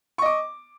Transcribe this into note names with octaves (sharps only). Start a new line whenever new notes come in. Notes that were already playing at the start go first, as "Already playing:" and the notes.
D#5 C#6 D6